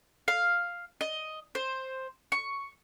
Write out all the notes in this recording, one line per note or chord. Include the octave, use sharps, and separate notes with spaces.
F5
D#5
C5
C#6